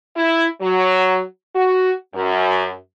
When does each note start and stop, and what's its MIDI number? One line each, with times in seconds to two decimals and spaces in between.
0.17 0.47 64
0.61 1.21 54
1.55 1.92 66
2.15 2.72 42